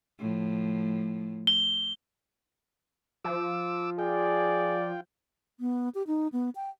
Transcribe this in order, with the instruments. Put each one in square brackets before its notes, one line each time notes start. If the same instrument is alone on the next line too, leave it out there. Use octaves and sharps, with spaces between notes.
[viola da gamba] A2 F3
[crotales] G7
[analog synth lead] F3 [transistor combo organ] D6 E6
[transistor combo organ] F4 G5 [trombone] G#4 [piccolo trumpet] D5
[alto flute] B3
G4
D#4
B3
G5